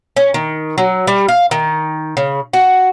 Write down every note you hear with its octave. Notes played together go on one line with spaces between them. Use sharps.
C#4
D#3
F#3
G3
F5
D#3
C#3
F#4